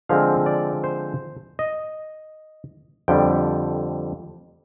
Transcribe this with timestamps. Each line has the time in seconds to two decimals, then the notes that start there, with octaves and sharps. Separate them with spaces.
0.09 D3 F3 G#3 C4 F5
0.46 D5
0.84 C5
1.59 D#5
3.08 F2 D3 G3 G5